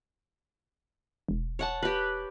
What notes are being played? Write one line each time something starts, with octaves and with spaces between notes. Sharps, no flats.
E1
C#5 F#5 A5
G4 B4